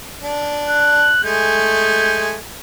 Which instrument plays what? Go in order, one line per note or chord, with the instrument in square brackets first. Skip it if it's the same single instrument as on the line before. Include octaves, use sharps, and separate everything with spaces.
[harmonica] D4
[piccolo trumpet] F#6
[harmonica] G#3 A3 G#5 [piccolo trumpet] G6